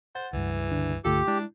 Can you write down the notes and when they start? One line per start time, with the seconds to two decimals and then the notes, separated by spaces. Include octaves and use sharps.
0.15 C5 F#5 A6
0.33 C#2 G2 E3
0.71 D3 D4
1.05 C2 G2 D3 A3 F4 G4 A4
1.28 G#3 D4 E4